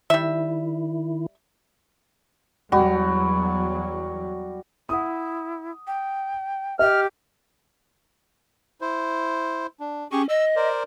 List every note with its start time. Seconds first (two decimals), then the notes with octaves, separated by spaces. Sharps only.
0.10 D#3 G3 E4 E5
2.72 E2 F#3 G3 F#4
4.89 E4 F#5 D#6
5.87 G5
6.79 G4 D#5 F6
8.81 E4 C5
9.80 D4
10.12 C#4 G4 G#4 C#6
10.29 D#5 E6
10.56 A#4 C5 D5